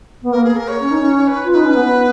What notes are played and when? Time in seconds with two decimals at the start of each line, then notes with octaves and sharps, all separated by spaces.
0.23 B3
0.32 A#3 A#4
0.44 G#4
0.56 A#4
0.68 C#5
0.80 C#4
0.91 D#4
1.01 C#4
1.27 B4
1.44 F4
1.52 D#4 B4
1.65 C#4
1.75 B3